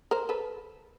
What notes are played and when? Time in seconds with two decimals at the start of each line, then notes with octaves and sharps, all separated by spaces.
0.11 A#4 C5
0.29 A4 B4